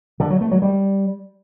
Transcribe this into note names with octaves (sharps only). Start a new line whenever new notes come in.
D3
F#3
A3
F#3
G3